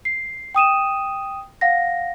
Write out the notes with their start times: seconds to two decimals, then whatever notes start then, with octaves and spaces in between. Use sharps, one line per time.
0.05 C7
0.55 G5 D#6 D#7 E7
1.61 F5 F#5 A#6